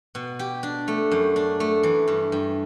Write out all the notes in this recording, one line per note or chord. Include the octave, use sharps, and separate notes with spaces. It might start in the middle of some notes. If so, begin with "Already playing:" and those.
B2
G4
D4
A3
F#2
D4
A3
E3
G2
G2